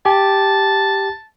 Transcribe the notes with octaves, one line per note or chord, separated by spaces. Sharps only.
G4 A5